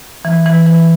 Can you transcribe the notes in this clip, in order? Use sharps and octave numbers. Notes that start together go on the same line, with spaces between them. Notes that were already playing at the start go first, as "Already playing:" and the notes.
E3
E3
E3